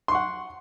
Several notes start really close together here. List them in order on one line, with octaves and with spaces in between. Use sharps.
C6 C#6 F#5